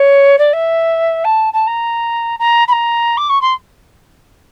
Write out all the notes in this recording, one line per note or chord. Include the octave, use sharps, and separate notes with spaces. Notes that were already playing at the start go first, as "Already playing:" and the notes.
Already playing: C#5
D5
E5
A5
A5
A#5
A#5
B5
A#5
D6
C#6
C6